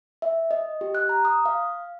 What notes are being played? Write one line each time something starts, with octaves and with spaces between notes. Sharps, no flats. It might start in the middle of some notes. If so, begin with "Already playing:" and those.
E5
D#5
G4
F#6
A#5
D#6
F5